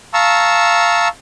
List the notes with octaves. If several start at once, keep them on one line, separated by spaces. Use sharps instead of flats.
F5 A5 A#5 C#6 E6